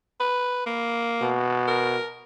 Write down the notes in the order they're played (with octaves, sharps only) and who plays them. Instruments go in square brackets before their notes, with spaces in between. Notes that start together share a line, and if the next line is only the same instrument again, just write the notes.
[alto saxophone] B4
A#3
[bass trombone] B2
[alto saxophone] A#4